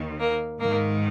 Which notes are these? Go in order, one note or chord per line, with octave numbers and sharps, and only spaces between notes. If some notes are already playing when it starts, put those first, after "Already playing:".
Already playing: D#2 D#3
A#3
G#2 D#3 A#3